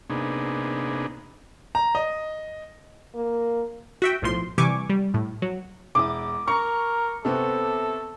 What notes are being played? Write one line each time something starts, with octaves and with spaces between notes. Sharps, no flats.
C3 A#3 B3 D4 D#4 G#4
A#5
D#5
A#3
F#4 E5 G5
B1 A2 F3 C6
C3 E3 G3 G#5 C#6 D6
G3
A2
F#3
E1 E4 D6 D#6
A#4 A#5 C#6
C3 B3 C4 A4